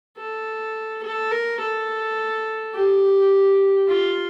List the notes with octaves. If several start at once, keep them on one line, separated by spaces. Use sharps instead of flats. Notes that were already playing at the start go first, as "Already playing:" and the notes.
A4
A4
A#4
A4
G4
F4